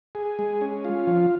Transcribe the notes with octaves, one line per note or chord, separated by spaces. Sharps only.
G#4
G#3
C#4
F4
F3